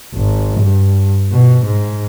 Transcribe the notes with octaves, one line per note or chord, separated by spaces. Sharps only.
G#1
G2
B2
G#2